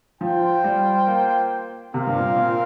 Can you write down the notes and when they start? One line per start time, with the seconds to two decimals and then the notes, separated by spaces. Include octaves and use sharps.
0.21 F3 F4 C5 G5
0.64 G3
1.07 A#3
1.93 C3 C4 F4 A#4 F5
2.07 G2
2.16 A#2
2.37 A#2